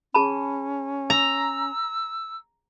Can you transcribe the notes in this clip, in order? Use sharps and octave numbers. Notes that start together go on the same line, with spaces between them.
C#4 G#4 A5 B5
A#5 E6